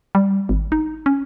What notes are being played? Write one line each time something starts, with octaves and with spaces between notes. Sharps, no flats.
G3
G#1
D#4
C#4